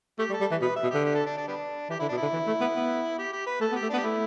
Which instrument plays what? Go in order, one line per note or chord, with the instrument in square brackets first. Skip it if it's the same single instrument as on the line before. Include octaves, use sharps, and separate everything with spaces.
[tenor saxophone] A3 [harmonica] G4
[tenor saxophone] G3
[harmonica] A4
[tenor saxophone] G3
E3
[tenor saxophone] B2 [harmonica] B4
[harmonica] E5
[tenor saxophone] B2
[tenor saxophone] D3 [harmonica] G4
[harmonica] G4
A4
D4
D4
G3 B3 D4
[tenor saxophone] E3 [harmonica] G4
[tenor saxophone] D3 [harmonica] E4
[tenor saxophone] B2 [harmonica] D4
[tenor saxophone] D3 [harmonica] E4
[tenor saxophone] E3
A3
B3
B3
[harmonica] G4
G4
B4
[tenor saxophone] A3 [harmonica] A4
[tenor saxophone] B3
[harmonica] G4
[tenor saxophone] A3
[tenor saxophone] B3 [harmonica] D4
[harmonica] G4
[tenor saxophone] A3 [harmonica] E4